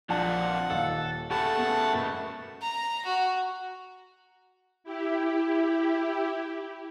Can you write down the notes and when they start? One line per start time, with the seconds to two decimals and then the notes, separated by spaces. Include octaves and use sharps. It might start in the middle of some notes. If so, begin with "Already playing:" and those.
0.09 A#1 F2 A#2 D4 F#5 A5
0.70 D#1 D#3 A4 F5
1.31 C#3 A3 G4 A4 F#5 A5 B5
1.57 B3
1.93 B2 B3 A#4
2.61 A#5
3.05 F#4
4.84 E4 G4